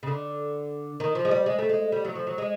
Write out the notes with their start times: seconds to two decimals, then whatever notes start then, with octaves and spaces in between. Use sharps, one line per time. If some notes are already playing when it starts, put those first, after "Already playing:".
0.03 C#3
0.07 D3
1.00 D#3
1.15 F3
1.25 G#3
1.31 G3
1.46 G#3
1.59 A3
1.69 G#3
1.92 G3
2.05 F#3
2.15 F3
2.27 F#3
2.38 G#3